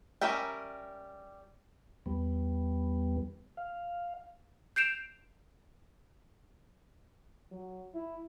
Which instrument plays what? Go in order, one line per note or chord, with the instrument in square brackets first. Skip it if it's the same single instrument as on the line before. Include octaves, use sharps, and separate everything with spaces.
[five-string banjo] G3 C#4 A#4 E5 G5
[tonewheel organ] E2 G3 B3
F5
[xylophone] G6 C7 D7 E7 F7
[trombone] F#3
E4